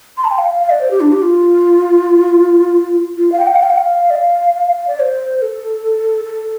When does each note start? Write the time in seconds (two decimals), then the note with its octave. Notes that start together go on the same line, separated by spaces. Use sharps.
0.17 C6
0.24 A5
0.31 G5
0.38 F5
0.48 F5
0.60 F5
0.70 D5
0.81 C5
0.91 G4
1.01 D4
1.12 G4
1.22 F4
3.18 F4
3.32 F5
3.39 G5
3.47 F5
3.55 G5
3.63 F5
3.70 G5
3.78 F5
4.10 D5
4.16 F5
4.88 D5
5.00 C5
5.42 A4
6.25 A4